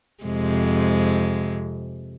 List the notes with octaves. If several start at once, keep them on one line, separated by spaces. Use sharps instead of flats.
F2 C3 G#3